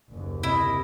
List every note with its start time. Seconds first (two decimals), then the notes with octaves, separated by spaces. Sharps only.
0.11 F#1 D#2
0.43 C3 E4 D#5